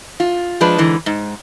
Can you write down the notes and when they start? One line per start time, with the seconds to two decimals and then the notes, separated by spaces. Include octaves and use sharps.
0.20 F4
0.61 F3 G#3 D4 B4
0.78 G#2 D3 E3
1.06 G#2